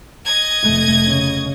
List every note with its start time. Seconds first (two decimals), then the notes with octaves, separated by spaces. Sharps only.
0.24 D#5 G#6
0.64 F1 A3
1.07 C#3 C#4